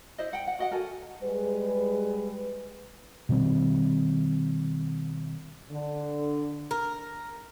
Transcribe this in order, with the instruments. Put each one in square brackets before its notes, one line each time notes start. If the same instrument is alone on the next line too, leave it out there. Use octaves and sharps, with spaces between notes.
[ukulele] E4 C5 D#5
F#5 G5
F#5
F#4 D#5 F#5
F#4 A4 A#4 G#5
[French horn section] G3 G#3 G#4 B4
[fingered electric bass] B2 D#3 G3 C4
[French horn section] D3
[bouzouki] A#4